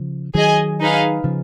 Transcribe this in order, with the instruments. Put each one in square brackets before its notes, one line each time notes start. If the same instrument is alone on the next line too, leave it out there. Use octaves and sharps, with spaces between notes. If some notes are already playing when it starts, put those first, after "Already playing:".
Already playing: [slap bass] C#3 F3
[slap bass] D#3 F#3 [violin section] G#4 D#5 G#5
[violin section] D#4 G#4 B4 F5
[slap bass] C#3 F3